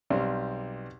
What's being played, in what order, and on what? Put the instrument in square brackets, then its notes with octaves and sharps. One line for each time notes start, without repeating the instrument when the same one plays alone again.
[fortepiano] B1 G3 C4